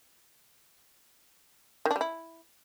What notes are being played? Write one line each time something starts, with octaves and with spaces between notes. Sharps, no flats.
D#3
D4
G3
E4